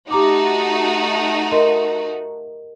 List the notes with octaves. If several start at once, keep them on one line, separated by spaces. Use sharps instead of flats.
A3 D#4 F#4 G4 A#5 D6
A#4 D#5 C6